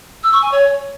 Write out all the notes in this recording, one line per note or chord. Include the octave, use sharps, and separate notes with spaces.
E6
C#6
G#5
C#5